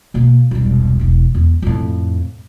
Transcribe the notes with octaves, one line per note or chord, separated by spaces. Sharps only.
B2 A#3
E1 C2
E1 E4
E2
F2 A2